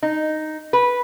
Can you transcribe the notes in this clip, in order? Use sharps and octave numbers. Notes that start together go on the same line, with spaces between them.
D#4
B4